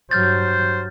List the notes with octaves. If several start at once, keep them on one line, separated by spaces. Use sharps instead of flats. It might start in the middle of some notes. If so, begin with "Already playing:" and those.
G2 F#3 C5 F6 G6 A6